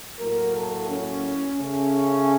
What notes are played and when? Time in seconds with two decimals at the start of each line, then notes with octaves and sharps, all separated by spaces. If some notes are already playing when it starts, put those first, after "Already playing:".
0.19 A2 F#3 A#3 A#4
0.54 A4
0.88 C#4
1.58 C#3 A3 C#4